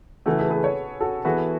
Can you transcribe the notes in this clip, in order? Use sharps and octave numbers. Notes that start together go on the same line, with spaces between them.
C#3 E3 A3 F#4 A4
G#4 B4
G#4 B4
A4 C#5
F#4 A4
E3 B3 F#4 G#4 A4 B4